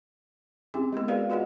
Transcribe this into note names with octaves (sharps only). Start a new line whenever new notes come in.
C4 C#4 E4 G4 G#4
G#3 A#3 B3 A#4
F#4 G#4 A#4 B4 D5 F5
F4 G#4 B4 D#5 F#5